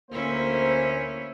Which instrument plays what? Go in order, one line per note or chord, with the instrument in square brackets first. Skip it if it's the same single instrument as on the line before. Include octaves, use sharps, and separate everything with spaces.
[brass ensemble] D2 A#3 C5 [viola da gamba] C#4 E4